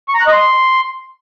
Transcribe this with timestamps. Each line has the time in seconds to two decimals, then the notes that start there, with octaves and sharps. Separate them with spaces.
0.08 C#6
0.14 A#5
0.20 F#6
0.27 D#5
0.33 C6